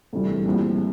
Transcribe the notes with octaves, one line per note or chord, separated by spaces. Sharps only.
E1 D2 C3 E3 G3
A#1 A2 G3 C4 E4